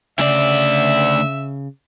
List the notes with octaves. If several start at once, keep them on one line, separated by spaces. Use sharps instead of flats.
D2 C#3 D5 E5